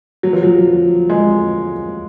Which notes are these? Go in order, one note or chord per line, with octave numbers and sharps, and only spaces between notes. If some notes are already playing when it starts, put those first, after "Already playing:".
F#3
F3
F#3
G#3